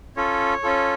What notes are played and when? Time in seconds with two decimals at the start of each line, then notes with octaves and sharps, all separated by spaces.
0.16 C#4 F4 A4 C#5
0.63 C#4 F4 A4